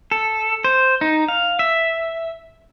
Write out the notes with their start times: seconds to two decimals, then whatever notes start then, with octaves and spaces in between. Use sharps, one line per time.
0.11 A4
0.64 C5
1.01 D#4
1.28 F5
1.59 E5